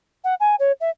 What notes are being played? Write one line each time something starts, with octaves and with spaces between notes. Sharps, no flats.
F#5
G#5
C#5
E5